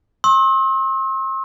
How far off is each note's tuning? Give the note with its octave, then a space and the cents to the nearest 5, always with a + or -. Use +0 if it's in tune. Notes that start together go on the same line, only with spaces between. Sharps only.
C6 +40 E6 -35